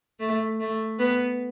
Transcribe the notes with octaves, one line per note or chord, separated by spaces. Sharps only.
A3
A3
B3